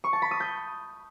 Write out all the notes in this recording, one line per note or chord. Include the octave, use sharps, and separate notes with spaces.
C#6
A5
B5
D#6
G6